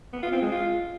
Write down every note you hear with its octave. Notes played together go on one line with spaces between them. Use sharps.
B3
F4
C4
G#3
F4